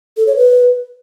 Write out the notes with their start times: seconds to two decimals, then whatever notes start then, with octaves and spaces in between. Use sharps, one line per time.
0.17 A4
0.27 C#5
0.37 B4